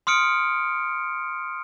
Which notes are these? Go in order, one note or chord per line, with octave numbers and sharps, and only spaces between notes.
C6 D#6 F6 C#7 D7